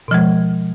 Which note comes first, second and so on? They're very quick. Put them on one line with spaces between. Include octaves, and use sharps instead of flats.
B2 F3 G#3